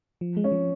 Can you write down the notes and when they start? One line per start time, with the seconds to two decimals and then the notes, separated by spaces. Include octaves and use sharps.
0.21 F3
0.37 G#3
0.44 C#4
0.52 F3